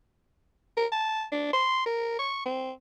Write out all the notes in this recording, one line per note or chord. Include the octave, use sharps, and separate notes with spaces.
A#4
A5
D4
C6
A#4
C#6
C4